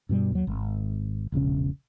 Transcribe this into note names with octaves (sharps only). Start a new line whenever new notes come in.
G2 B2 G3
D#2 F#3
G#1
E1 A#1 C#3 C#4